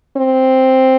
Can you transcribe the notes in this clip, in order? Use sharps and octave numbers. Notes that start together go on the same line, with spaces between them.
C4